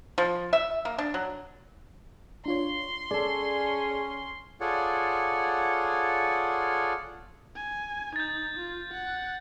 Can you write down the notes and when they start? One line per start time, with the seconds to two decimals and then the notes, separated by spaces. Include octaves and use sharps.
0.18 F3
0.53 E5
0.85 A#3
0.98 D4
1.14 F#3
2.46 D4 F4 C#5 C6
3.11 C#4 G#4 A4 D5
4.61 F4 G#4 A4 C#5 D5 F#5
7.56 G#5
8.16 D#4 G6 A6
8.59 F4
8.93 F#5